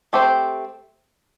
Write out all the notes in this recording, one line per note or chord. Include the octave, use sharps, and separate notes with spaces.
A3 C4 G4 C5